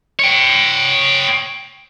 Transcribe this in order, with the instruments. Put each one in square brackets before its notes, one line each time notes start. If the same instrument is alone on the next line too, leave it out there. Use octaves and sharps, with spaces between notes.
[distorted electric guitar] C#5 G5